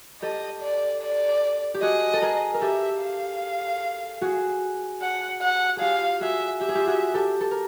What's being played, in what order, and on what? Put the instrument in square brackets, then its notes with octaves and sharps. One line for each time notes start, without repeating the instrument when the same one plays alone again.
[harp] G4 A4 [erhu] D#5
[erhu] D5
D5
[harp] G4
[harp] F#4 G#4 [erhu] D#5
[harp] A4
G#4 A#4
A#4
[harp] G4 A4 [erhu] E5
[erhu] F5
[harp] F#4 G#4
[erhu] F#5
F#5
[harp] F4 G4 G#4 [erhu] F5
[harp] F#4 G#4 [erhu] E5
[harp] G4 [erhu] E5
[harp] G#4
F4 G4
F#4 G#4
G4 A4
A4
A#4